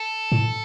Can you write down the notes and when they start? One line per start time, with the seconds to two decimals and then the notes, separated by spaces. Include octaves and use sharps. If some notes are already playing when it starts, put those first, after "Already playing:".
Already playing: A4
0.32 A2